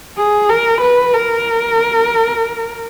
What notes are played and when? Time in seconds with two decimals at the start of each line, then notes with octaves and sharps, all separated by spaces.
0.17 G#4
0.49 A#4
0.81 B4
1.13 A#4